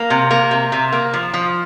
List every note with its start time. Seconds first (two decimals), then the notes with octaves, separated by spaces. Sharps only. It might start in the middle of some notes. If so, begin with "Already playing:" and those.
Already playing: A#3
0.10 C3
0.31 A#3
0.51 C3
0.72 C3
0.92 A#3
1.13 F3
1.34 F3